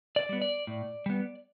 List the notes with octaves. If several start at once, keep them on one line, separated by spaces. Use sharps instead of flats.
D5
G3 B3
D5
A2
G3 B3